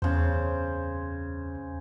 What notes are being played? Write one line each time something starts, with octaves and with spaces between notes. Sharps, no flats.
E2 C#3 C5